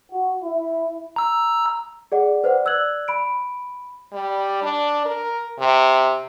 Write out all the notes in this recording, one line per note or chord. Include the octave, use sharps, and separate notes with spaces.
F#4
E4
A#5 E6
G#4 D5 F#5
B4 C5 D5 F#5
D5 E6 F#6 G#6 F#7
B5 D7
G3
D4
A#4
C3